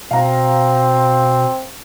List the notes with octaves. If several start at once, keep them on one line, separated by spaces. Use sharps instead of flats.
B2 C4 F5 A#5